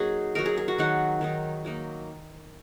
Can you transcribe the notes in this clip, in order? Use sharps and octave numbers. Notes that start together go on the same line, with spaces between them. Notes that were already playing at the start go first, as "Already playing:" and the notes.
Already playing: F#3 A#3 D#4 F#4 G#4
F#3 D#4 A#4
G#4
G#4
F#4
D#3 F#3 D#4 F#5
D#3 F#3 D#4
F#3 A#3 D#4